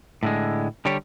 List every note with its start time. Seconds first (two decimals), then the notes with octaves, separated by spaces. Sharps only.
0.23 A2 D3 G#3
0.85 D3 G3 G4 C#5